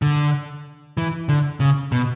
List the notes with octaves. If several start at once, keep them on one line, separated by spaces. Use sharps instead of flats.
D3
E3
D3
C#3
B2